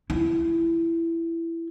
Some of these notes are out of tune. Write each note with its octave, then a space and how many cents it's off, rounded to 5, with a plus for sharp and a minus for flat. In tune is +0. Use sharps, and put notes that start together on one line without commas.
E4 +15